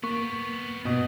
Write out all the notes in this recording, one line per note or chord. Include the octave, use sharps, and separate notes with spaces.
A#3 B3 G4 C#6
G2 B2